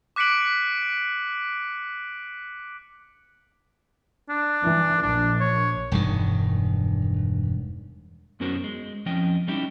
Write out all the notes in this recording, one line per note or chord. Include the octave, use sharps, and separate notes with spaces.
D6 F#6 B6 C#7 D7 F#7
D4
E3
A#1 D4
C#5
E1 G2 D#3
F#2 B3 C#4 F#4 A#4 C5
G#3
F2 F3 C#4 D#5 G5
G3 C#4 D#4 E4 G4